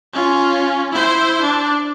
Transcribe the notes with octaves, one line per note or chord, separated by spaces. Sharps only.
C#4 F4
E4 C5
D4